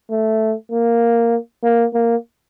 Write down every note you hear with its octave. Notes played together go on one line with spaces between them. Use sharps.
A3
A#3
A#3
A#3